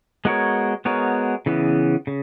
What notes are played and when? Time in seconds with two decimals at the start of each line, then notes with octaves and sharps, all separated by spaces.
0.25 G#3 B3 F#4 A#4 C#5
0.85 G#3 B3 F#4 A#4 C#5
1.46 C#3 E3 B3
2.07 C#3